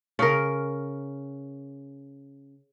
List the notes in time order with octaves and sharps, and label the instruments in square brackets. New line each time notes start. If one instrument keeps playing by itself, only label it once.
[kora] C#3 A#4